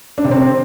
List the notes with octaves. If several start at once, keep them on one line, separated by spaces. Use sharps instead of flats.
D4
C3
C4